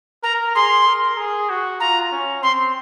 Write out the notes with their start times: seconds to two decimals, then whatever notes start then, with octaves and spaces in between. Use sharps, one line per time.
0.23 A#4 A#5
0.55 G#4 C6
0.87 A#4
1.17 G#4
1.49 F#4
1.80 F4 A#5
2.12 C#4
2.42 C4 C6